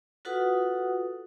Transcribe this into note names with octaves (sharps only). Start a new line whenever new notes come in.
F4 F#4 A4 B4 F#5 D#6